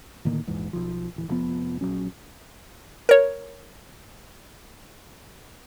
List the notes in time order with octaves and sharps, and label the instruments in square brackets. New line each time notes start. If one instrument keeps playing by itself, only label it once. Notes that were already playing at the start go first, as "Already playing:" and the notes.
[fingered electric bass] A2 D3 D#3 A#3
A#1 E2 G#2
B1 F3
D1 E3
F1 F3 B3
A#1 F#3 C#4
[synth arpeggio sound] A#4 C#5